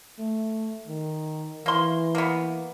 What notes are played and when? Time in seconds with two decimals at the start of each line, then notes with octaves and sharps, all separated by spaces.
0.19 A3
0.88 D#3
1.66 E3 A#3 C6
2.15 A#3 B3